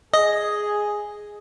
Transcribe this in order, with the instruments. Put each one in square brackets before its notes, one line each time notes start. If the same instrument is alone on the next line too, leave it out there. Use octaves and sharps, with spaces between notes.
[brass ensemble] G#4 [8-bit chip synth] D#5